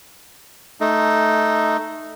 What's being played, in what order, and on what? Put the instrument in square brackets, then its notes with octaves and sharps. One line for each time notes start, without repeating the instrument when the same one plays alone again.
[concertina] A3 D#4